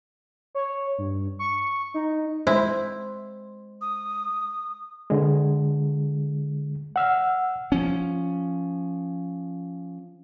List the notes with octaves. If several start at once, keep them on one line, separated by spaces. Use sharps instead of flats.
C#5
G2
C#6
D#4
G#3 E4 C5
D#6
D3 G#3
F#5 E6 F6
F3 C#4